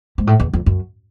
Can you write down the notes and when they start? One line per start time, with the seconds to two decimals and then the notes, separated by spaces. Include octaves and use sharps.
0.18 G#2
0.27 A2
0.40 E2
0.53 F2
0.66 F#2